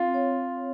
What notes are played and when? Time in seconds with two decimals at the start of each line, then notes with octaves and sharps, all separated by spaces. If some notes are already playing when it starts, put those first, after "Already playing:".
Already playing: C4 F4
0.14 C#5